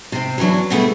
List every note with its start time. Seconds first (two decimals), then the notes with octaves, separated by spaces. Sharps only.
0.12 C3 C4
0.38 E2 E3 F#3 C#4 D4
0.70 B2 D3 G3 A3 B3 G#4